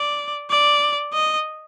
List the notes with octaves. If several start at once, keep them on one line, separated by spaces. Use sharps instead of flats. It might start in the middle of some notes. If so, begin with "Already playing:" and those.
Already playing: D5
D5
D#5